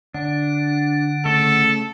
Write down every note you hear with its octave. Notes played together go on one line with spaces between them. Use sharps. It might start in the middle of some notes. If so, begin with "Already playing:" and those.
D3 D4 F#5
C#3 A3 A4 E5